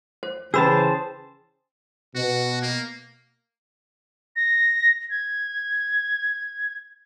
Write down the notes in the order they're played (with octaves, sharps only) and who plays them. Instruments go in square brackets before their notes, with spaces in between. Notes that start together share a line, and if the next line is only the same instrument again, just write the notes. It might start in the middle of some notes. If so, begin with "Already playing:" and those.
[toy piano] C5
[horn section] C#3 E3 [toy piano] C#4 B5 E6 [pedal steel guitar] G#4 C5 A5
[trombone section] B2 [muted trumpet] F#4
[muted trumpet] A#3
[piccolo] A#6
G#6